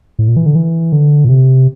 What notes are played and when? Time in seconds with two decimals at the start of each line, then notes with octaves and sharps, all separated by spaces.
0.19 A2
0.28 A#2
0.36 E3
0.46 D3
0.55 E3
0.92 D3
1.25 A#2
1.29 C3